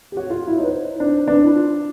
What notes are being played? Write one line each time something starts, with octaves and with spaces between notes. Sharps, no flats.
G4
F#4 C#5
F4
E4
D#4 B4
C5
D4 C5
D4 B4
E4
F4